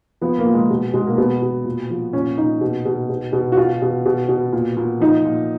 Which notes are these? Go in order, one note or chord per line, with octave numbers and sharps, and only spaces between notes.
F3 B3
A#3
A#2
G#3
B2
B2 G#3
A#3
B2 B3
B2
A#2
F3
A#2 C#4
A#2 D#4
B2
B2
B2
B2
F#4
B2 F4
B2
B2
B2
A#2
A#2
F3 D#4
A#2